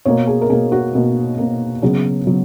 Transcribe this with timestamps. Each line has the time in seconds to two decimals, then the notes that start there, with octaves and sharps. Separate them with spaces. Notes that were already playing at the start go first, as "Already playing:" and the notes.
0.05 B2 A#3 C#5
0.27 G#4
0.42 A#4
0.50 B2 A#3 G#4
0.72 F#4
0.94 B2 A#3
1.38 B2 A#3
1.82 C#3 F#3 B3 G#4
2.26 C#3 F#3 B3